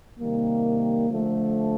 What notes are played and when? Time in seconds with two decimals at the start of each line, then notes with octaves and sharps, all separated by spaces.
0.18 C3 D#3 G3 A#3
1.08 D3 F3 A3